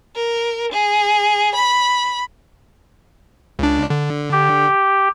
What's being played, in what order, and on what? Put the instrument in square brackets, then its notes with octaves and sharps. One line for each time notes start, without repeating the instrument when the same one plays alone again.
[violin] A#4
G#4
B5
[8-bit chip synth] C#2 D4
D3
[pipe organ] G4